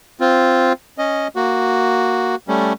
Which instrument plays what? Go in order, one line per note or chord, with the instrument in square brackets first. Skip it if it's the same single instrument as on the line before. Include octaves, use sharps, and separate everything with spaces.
[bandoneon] C4 F4
C#4 D#5
A#3 F#4
G3 A3 C#4